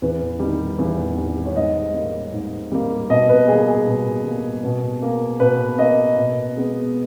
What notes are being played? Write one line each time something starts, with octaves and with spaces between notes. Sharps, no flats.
E2 B4
D#3 G3
E2
D#3 G3
C#5
G#2 D#5
G3 A#3
G#2
G3 A#3
B2 D#5
B4
G3 A#3 G#4
G#4
B2
G3 A#3
B2
A#3
B2 B4
A#3 D#5
B2
G#3 B3